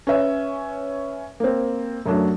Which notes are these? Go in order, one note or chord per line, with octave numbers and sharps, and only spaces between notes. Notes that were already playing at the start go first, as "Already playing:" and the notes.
C#4 B4 E5
A#3 C4
F#2 F#3 A3 D4